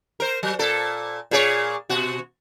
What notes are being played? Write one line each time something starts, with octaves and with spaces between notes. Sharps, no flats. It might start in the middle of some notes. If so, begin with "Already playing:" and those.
A#4 C5
F#3
A#2 A4
A#2 G#4 C#5
B2 F#4